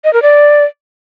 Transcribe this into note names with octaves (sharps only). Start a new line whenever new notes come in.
D#5
A#4
D5